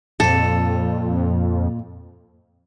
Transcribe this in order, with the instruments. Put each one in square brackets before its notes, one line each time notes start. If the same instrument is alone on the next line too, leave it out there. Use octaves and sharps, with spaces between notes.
[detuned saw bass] F2 [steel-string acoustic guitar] A#2 F4 [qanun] A4